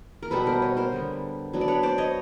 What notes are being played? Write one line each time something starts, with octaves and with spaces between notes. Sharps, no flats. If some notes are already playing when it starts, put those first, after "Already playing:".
A#4
B2 G3 B3 A4 B4
A#4 C5
B4 C#5
A#4 C5
D3 G3 B3
F#3 B3 D4
D5
B4 C#5
C5 D5
C#5 D#5